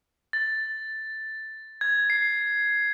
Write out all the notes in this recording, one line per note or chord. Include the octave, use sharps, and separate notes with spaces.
A6
G#6
C7